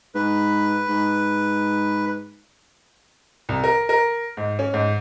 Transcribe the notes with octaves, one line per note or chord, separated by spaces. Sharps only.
G#2 B4
G#2
C2
A#4
A#4
G#2
C#4
G#2